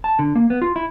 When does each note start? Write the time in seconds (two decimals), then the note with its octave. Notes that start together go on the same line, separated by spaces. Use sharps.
0.04 A5
0.19 D3
0.36 A#3
0.50 B3
0.62 F4
0.76 E4